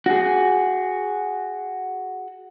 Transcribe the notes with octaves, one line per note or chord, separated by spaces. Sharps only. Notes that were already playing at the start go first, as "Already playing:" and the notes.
F#4 G#4